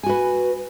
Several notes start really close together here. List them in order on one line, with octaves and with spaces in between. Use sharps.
G#5 F#4 B4